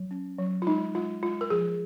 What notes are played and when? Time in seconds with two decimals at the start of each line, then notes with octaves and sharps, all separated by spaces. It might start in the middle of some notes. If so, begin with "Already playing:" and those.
Already playing: F#3
0.11 C#4
0.39 F#3
0.62 F4
0.67 G#3 D#4
0.95 G#3 F4
1.23 G#3 F4
1.41 A#4
1.50 F3 G#4